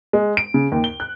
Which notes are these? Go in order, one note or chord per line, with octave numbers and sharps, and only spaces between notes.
G#3
D7
C#3
D#2
G7
F#6